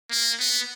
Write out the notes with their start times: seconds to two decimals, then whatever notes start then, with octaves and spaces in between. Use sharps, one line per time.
0.12 A#3
0.40 B3